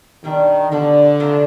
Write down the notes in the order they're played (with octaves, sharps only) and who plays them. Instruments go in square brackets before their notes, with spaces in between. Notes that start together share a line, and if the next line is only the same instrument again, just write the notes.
[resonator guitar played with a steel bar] B2 G3 D4 [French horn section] D#3
[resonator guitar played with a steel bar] B2 G3 D4 [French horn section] D3
[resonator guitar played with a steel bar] C3 D#3 G3 D4 F4